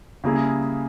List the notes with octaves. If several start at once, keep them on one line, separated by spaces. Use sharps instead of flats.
C#3 G3 A#3 E4 G#4